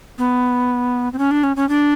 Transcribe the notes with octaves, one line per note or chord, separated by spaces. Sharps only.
B3
C4
C#4
D4
C#4
C#4
D4